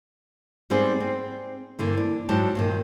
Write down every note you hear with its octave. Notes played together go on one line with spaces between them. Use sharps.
G#2 G3 B3 C4 G#4 D5
C4
G2 D3 E3 A#3
D4
G#2 F#3 G3 D4 G4 A5
G2 A#2 D#3